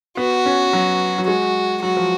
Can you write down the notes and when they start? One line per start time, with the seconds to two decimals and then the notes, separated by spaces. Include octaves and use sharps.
0.17 B3 F#4
0.46 C#4
0.73 F#3
1.18 F#3
1.28 G#3 F#4
1.83 F#3 F#4
1.97 F3